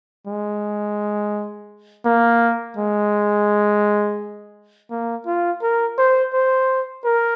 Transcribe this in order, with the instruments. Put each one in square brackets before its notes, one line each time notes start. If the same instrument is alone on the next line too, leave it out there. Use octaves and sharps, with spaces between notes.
[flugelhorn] G#3
A#3
G#3
A#3
F4
A#4
C5
C5
A#4